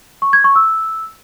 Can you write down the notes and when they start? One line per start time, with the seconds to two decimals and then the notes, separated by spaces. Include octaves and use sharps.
0.22 C#6
0.33 G#6
0.44 C#6
0.55 E6